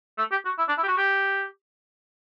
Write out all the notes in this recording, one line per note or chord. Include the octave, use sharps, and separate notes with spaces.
A3
G4
F#4
E4
D4
E4
G4
F#4
G4